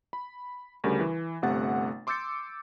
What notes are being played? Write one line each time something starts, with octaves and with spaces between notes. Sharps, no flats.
B5
D2 C#3 G3 A#4
E3
G1 C3 A3 F#5 A6
C6 D6 E6 G6 A6 C#7